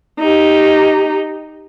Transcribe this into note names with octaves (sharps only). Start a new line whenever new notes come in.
D#4 G4